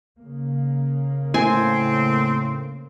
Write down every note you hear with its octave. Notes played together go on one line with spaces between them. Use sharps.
C#3 A#3
A2 C4 G#5